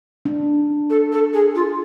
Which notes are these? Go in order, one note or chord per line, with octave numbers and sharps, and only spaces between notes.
D4
A4
A4
G#4
F4